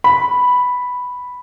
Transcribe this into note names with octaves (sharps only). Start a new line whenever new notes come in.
B5